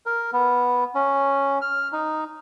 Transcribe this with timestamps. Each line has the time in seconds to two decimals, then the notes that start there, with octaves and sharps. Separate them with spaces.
0.06 A#4
0.33 B3
0.95 C#4
1.62 F6
1.92 D#4